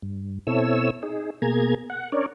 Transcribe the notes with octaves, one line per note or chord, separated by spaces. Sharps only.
G2
B2 C4 E4 A4 C#5 E6
D#4 G#4
B2 A#3 G#4 A#5 G#6
F#5
C#4 D4 A#4 C#5 D5